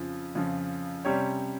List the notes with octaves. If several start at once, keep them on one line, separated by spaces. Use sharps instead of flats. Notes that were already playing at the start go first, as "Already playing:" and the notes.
Already playing: F2 C#3 F3
F2 C#3 F3
C3 G3 C#4 G4 C#5